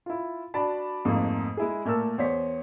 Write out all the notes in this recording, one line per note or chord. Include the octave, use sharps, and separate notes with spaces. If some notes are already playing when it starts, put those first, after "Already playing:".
E4 F4
D4 F#4 D5 A5 B5
F2 G#2 A3 A#3
G#3 E4 G#4
A#2 A3 A#4 A5 E6
E2 C5 C#5 B6